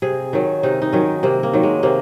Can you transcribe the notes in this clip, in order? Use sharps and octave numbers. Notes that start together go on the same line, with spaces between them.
C3 G#4
D#3 F#3
C3 D#4
D#4
D#3 F#3 C#4
C3 A#3
A#3
D#3 F#3
G#3
C3 A#3